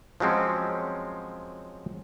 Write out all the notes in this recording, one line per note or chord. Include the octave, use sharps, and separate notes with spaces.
F3 F#3 G#3 C4 C#4